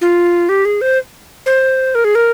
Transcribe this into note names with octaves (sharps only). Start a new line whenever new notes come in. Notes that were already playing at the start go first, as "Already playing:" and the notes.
F4
G4
G#4
C5
C5
A#4
G#4
A#4